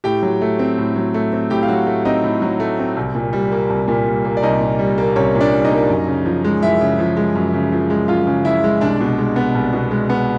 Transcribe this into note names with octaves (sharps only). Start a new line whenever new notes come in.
A2 G4 G5
F#3
A3
C4
A2
F#3
A3
C4
A2 G4 G5
F5
F#3 F#4 F#5
A3
C4 D#4 D#5
A2
F#3
A3
C4
C2
A#2
G3
A#3
C2
A#2
G3
A#3
D5
C2 D#4 D#5
A#2
G3
A#3
C2 C#4 C#5
A#2
D4 D5
G3
D#4 D#5
A#3
F#2
C#3
F3
G#3
F#2 E4 E5
C#3
F3
G#3
F#2
C#3
F3
G#3
F#2 F4 F5
C#3
F3 E4 E5
G#3
C2 D4 D5
B2
G#3
B3
C2
B2
G#3
B3